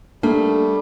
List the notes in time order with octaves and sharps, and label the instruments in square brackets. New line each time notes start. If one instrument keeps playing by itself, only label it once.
[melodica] G3 [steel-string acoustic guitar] A3 [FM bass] A#3 [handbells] D4